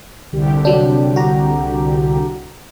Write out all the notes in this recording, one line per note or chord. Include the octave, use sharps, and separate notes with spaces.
C2 D3 G4
F#3 D4
F#4 A#5